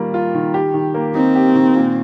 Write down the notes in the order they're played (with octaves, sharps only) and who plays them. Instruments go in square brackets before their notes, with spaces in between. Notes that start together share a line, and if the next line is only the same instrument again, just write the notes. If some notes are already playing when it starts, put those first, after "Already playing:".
Already playing: [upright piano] D#3 G3 A#3 F4
F4
D#3
G4
D#3
A#3
[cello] C4 [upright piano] D#4
[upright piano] G4
D#3
A#2